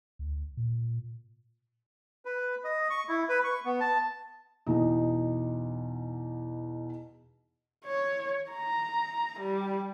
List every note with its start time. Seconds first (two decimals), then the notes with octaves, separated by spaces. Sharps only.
0.19 D2
0.57 A#2
2.25 B4
2.64 D#5
2.90 C#6
3.09 E4
3.29 B4
3.44 C#6
3.65 B3
3.80 A5
4.66 E2 B2 D#4
7.85 C#5
8.51 A#5
9.40 G3